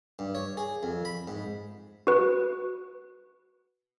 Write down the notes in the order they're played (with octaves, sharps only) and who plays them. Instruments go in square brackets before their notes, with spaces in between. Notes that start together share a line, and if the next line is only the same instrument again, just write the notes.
[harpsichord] G2
C#5
G#4
F2
B5
G#2
[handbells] F#4 B4